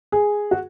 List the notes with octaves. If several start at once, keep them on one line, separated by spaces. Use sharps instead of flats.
G#4
F#4